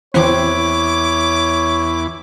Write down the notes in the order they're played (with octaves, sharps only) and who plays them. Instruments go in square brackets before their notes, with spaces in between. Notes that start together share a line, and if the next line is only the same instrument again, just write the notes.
[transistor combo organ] E2 E4 [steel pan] E3 C4 [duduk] C#5 [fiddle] D6